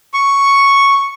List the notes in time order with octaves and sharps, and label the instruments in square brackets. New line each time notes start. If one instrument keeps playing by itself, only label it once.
[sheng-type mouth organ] C#6